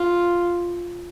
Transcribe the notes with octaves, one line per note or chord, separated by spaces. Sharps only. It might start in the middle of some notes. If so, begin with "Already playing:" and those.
Already playing: F4